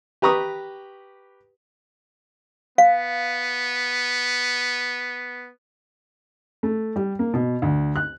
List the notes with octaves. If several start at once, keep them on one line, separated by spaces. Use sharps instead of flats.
G4 B4 A#5 C#6 D#6
B3 F5
A3
G3
A#3
B2
D2
F#6